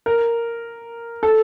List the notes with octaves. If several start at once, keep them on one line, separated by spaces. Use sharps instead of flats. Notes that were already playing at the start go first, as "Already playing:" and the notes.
A#4
A4